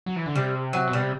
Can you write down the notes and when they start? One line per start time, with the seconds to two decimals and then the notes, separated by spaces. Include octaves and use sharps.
0.06 F#3
0.16 E3
0.26 D3
0.35 C3 G3
0.73 F#3
0.88 B2
0.93 G3
1.00 C3